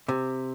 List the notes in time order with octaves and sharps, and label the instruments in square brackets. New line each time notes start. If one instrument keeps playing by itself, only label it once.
[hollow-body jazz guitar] C3